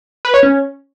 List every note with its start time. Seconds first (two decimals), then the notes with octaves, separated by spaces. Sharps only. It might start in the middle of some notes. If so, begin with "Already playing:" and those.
0.25 B4
0.34 C#5
0.43 C#4